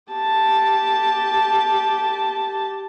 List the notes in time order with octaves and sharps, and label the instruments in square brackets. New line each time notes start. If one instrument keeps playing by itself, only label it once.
[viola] G4 A5